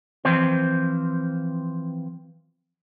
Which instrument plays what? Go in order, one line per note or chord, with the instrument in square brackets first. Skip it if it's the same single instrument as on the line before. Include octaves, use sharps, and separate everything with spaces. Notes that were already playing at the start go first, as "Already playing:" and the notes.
[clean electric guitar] E3 F3 C4 C5